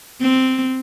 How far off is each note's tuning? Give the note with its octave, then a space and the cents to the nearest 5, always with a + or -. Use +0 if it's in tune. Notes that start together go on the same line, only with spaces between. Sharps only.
C4 -5